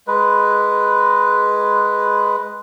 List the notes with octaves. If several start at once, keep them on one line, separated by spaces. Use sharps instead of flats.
G#3 B4